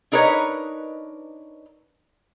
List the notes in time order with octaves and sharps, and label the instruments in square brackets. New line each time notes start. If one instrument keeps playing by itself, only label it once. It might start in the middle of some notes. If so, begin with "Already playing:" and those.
[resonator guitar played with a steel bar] D4 D#4 A#4 B4 C#5 D#5